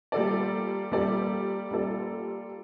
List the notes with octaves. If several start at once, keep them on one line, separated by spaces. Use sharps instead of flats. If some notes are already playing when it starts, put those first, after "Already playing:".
G3 A#3 F4 A4 D5
G3 A#3 F4 A4 D5
G3 A#3 F4 A4 D5